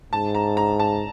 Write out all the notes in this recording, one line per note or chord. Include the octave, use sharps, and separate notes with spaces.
G#2 A5
A#5
A#5
A5